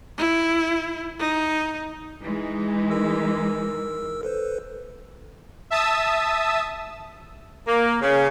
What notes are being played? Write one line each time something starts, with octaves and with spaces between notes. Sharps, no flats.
E4
D#4
E3 G#3 D#4
A#4 E6
A4 B4 C5
E5 A5 D#6 E6
A#3
C#3